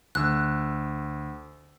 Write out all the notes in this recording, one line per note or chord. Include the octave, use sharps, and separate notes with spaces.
D2 E6 F#6